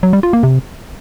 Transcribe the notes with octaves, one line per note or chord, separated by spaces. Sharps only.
F#3
G3
F4
A#3
C3